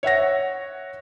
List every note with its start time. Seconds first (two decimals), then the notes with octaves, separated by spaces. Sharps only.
0.03 C#5 E5 F#5 A#6